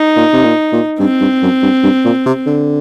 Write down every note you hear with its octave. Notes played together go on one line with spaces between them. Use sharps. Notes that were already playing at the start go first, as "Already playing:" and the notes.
Already playing: D#4
A#2
C3
A#2
A#2
G2 C4
G2
F#2
G2
G2
A#2
C3
D3